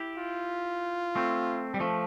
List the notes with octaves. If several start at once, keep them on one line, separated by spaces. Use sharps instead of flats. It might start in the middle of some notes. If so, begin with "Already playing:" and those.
Already playing: E4 G4
F4
A3 C4
G3
F3 A3